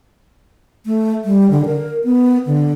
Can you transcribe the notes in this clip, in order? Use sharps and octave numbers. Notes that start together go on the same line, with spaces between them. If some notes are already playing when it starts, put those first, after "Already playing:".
A3
G3
D3
A#4
B3
D3